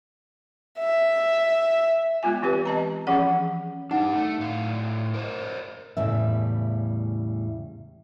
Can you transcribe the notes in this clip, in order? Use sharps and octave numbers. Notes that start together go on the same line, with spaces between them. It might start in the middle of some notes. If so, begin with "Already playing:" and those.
E5
G#3 B3 F4 G#5
E3 C4 G4 B4
D#5 A5 A#5
E3 F3 C#4 G#4 F#5
D4 D#4 G4 F#5
A3
A2 F5
A#4 C5 D#5
E2 A2 C#3 G3 E5